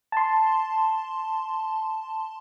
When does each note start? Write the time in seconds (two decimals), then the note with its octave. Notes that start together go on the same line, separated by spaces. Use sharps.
0.12 A5 C6